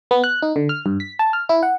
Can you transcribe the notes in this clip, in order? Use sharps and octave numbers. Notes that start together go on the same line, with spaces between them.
B3
F#6
D#4
D3
F6
G2
B6
A5
F6
E4
F#5